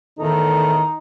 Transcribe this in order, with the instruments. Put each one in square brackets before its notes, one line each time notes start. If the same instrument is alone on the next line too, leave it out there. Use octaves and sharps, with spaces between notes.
[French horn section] E2 A2 A4 [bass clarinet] D#3 [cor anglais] D#4